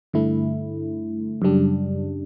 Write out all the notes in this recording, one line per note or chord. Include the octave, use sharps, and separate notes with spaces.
G2 D3 A3 E4
F#2 C#3 G3 D4